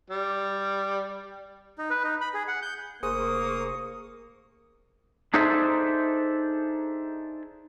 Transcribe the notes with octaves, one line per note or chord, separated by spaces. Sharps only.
G3
D#4
B4
D#4
B5
G#4
F#5
G6
F1 A#3 G#4 C5 C#6 D#6
D4 D#4 G#4 A4 C5 E5